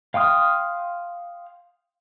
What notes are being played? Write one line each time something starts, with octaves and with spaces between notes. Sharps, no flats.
F5 G5 C6 D#6 F6